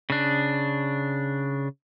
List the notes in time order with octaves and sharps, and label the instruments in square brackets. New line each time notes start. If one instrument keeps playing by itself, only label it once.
[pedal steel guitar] C#3 D4